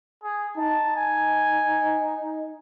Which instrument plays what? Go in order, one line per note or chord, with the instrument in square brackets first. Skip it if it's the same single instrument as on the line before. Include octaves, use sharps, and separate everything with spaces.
[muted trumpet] G#4
[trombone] D#4 [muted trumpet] A5
[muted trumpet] G#5